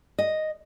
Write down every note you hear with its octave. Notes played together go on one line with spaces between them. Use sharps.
D#5